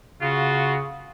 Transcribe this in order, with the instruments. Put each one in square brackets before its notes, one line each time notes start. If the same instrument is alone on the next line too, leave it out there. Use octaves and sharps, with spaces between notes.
[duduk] C#3 [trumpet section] F4 F#4